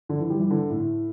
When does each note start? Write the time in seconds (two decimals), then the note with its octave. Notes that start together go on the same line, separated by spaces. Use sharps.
0.09 D3
0.20 E3
0.30 G3
0.40 E3
0.50 D3
0.70 A2